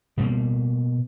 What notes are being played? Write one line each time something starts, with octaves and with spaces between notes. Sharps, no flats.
B2 G3 A#3